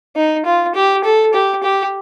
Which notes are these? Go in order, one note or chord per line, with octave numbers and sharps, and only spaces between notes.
D#4
F4
G4
A4
G4
G4